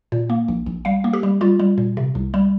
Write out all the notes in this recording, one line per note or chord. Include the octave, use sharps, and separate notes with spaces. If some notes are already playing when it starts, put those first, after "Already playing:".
A#2
A#3
A#1
A#1
G3 F5
A#3
G4
G3
G3 F4
G3
A#2
C3
C2
G3